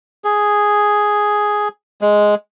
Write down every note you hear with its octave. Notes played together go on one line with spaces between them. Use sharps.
G#4
G#3